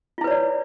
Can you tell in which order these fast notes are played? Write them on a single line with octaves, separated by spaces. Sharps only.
F4 E4 B4 C#5 D5